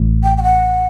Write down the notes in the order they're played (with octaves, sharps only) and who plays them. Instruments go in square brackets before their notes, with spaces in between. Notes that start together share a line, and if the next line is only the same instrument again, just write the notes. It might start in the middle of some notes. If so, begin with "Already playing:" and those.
Already playing: [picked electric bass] A1 A2
[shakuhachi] G5
G5
F#5